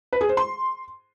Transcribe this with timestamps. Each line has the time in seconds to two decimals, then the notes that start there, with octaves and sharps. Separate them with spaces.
0.13 B4
0.21 G#4
0.29 C5
0.37 C6